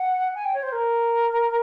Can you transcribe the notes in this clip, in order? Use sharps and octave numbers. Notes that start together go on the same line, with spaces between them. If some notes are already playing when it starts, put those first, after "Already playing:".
Already playing: F#5
G#5
G5
C#5
C5
A#4